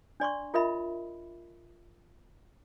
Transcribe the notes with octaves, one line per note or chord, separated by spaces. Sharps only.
D4 D5 C6 C#6
F4 A#4 D#5 E5 B5